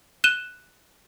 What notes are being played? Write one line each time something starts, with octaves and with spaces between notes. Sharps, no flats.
F#6 D#7 E7 G7